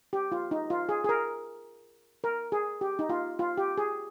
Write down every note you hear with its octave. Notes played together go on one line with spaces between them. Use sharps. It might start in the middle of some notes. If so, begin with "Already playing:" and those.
G4
F4
D#4
F4
G#4
G#4
A#4
A#4
G#4
G4
D#4
F4
F4
G4
G#4